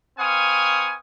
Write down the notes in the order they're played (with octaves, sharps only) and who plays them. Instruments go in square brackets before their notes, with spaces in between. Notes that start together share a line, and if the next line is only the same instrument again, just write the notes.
[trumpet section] C4 B4 F5 G#5 C#6 D#6